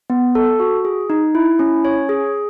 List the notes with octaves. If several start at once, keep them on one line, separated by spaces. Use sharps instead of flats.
B3
A4
F#4
G#4
D#4
E4
C#4
C#5
G#4